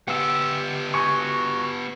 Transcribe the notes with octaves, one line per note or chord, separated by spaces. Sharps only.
B3 G4 F#5 E6
F#4 G#5 C#6